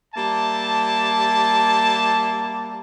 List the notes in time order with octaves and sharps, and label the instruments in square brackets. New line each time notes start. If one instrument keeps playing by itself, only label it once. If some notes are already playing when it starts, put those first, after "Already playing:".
[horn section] G3 A#3 E5 A5